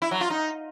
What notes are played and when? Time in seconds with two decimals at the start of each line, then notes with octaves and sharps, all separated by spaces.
0.02 E4
0.11 F#3
0.21 F4
0.30 D#4